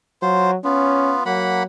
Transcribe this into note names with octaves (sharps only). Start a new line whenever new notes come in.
F#3 F4 C5
B3 C#4 F4
F#3 A#3 F#5 B5